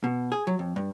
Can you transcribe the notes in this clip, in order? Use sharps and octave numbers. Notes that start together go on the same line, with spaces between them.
B2
G#4
F#3
F2
G2